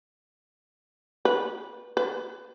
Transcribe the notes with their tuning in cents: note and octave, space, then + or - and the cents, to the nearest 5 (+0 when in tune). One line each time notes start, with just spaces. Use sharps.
B4 -20
B4 +20